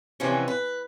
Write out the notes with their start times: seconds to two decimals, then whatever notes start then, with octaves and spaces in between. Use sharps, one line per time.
0.20 C3 E3 F3 G3 B3 C#4
0.48 B4